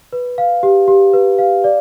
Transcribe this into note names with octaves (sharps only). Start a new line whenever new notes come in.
B4
F5
G4
G4
B4
F5
D5